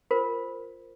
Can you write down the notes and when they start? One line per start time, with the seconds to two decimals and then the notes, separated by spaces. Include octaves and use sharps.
0.11 F4 A#4 C5